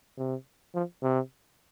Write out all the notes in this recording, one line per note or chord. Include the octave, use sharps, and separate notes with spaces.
C3
F3
C3